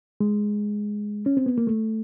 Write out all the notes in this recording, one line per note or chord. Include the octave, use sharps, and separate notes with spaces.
G#3
C#4
C4
B3
A#3
A3